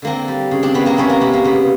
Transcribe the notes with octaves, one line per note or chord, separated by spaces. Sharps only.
D3 A#3 C4
G3
C#3
C4 D4
C#3 B3
A#3 C4
C3 B3 C#4
A#3
C3 B3
A#3
C#3 B3